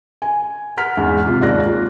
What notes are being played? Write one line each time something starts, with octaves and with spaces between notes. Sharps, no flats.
G#5
F#5 F6 B6
E2 G#2
C3 F4
D#2 G#2 D5 F#6 A#6
F4